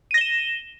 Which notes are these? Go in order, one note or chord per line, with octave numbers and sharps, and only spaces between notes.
A#6 D#7 E7 G7